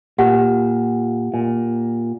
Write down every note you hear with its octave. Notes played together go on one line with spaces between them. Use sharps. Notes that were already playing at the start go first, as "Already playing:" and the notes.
A#2 G4 F#5
A#2